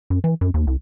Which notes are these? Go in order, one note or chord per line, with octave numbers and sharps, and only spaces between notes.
F#2
E3
F#2
D#2
C2